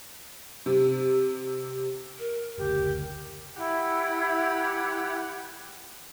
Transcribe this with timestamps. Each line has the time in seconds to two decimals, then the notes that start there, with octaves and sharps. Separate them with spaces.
0.66 C3
2.19 A#4
2.58 F#1 D2 G4
3.57 E3 E4 G4 F#5